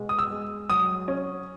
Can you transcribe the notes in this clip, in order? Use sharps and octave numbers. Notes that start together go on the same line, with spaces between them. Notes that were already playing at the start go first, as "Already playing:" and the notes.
Already playing: B2 G#3
D#6
E6
G#3
F#3 D#6
C#4